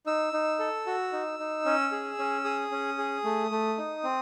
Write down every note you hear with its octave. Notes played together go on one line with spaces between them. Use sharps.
D#4 E6
D#4
A4
F#4
D#4
D#4
C#4
G#4
C#4
G#4 D#6
C#4
G#4
A3
A3
D#4
C4